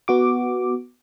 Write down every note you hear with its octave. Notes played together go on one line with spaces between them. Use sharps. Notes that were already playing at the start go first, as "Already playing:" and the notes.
B3 F#4 D6